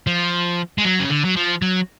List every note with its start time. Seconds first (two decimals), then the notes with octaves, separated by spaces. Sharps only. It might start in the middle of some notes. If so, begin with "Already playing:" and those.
0.07 F3
0.78 G#3
0.85 F#3
1.00 C#3
1.10 D3
1.25 F#3
1.36 F3
1.62 F#3